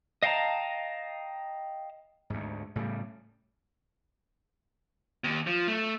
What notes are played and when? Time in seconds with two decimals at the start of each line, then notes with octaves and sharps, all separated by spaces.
0.23 D#5 F5 G5 A5 A#5
2.30 D2 G#2
2.76 A2 C#3 F#3 G3
5.24 D#2
5.47 F3
5.68 A3